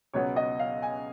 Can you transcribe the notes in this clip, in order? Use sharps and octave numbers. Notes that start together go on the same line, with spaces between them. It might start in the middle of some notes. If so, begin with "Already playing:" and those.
C#2 B2 F#3 B3 C#5
D#5
F5
G#5